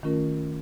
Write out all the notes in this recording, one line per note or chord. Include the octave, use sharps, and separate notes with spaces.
D#3 A3 C#4 F4 A#4